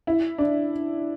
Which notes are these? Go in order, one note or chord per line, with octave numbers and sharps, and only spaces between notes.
E4
D4